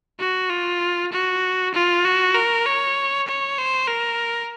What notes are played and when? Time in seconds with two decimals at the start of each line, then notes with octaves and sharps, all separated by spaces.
0.19 F#4
0.50 F4
1.12 F#4
1.74 F4
2.04 F#4
2.35 A#4
2.65 C#5
3.27 C#5
3.58 C5
3.88 A#4